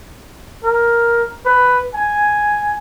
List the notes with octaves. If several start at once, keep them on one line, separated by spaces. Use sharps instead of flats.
A#4
B4
G#5